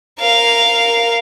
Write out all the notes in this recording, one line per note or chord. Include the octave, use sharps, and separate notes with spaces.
A#4 F5